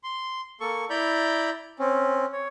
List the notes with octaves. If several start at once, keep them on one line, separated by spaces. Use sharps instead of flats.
C6
A#3 A4 C#6
E4 D5 A#5 B5 G6
C4 C#4
C#5